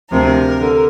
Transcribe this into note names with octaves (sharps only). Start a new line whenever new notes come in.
D2 C3 F3 A#4
D3